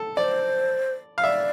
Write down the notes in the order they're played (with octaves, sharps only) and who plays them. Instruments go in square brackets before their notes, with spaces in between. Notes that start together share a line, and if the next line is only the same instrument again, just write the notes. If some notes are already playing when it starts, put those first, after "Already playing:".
Already playing: [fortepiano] A4
[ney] C5 [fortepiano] D5
[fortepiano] F5
[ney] D5 [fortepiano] E5